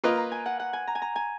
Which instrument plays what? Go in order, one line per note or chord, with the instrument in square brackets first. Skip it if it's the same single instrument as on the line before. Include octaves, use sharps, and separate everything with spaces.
[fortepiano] A#3 F4 B4 D#5
[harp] A#5
G#5
F#5
F#5
G#5
A#5
G#5
A#5
G#5